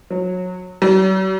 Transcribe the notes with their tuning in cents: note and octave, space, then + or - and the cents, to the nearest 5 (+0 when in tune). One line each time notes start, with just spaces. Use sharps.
F#3 -25
F#3 +45